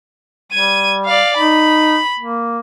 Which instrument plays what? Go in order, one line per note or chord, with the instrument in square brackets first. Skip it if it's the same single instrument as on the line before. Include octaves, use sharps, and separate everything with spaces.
[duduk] G3 [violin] G#6 D#7
[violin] D5 F5
[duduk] D#4 [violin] B5
[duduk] A#3